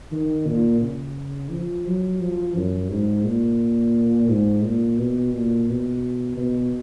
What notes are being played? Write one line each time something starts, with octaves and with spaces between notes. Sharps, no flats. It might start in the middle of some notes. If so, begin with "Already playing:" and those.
D#3
A#2
C#3
F3
F#3
F3
F#2
G#2
A#2
G#2
A#2
B2
A#2
B2
B2